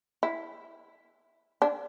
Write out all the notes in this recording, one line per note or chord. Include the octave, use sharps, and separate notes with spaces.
E4
D4